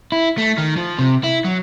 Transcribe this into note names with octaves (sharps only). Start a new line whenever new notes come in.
E4
A3
D#3
F3
C3
E4
F#3